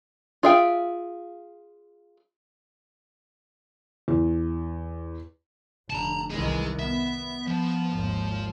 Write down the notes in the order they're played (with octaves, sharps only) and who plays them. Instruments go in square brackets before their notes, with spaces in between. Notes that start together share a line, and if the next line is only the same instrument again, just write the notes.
[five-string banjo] F4 G#4 E5 F5 G5
[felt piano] E2
[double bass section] F1 D3 [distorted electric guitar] A5 A#5
[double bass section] C2 D#3 E3 [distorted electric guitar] G#4 D#5
[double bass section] B3 [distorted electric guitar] E5
[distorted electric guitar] F3
[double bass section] G#1 D#2